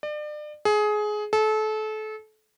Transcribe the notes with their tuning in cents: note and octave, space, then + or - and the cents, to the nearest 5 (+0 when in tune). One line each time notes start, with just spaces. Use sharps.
D5 +35
G#4 +20
A4 -30